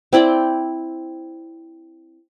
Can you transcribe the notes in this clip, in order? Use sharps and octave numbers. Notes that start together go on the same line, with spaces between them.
C4 E4 D5 G5